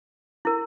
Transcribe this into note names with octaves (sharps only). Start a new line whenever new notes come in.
E4 A#4